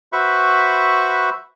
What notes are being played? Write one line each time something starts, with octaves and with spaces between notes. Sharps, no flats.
F#4 B4 C5 E5 B5 C#6